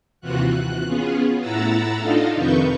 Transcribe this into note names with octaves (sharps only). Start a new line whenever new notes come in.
D#2 C3 E3 F4 F#4 F#6
F#6
B3 C#4 F4 G#4
A2 E4 F#5 A#5 E6 A6
D4 D#4 F4 A4 D#5 F5
F2 C3 D#3 B4 C#6 G6